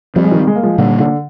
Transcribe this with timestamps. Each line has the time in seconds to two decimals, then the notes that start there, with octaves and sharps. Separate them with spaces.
0.16 F3 G3 C4
0.24 G#3
0.31 D#3 G3
0.47 G#3
0.56 A#3
0.63 F3 G#3
0.78 A#2 D3 G3 A#3
1.00 D3